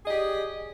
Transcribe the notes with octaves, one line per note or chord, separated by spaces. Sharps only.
G4 G#4 D5 D#5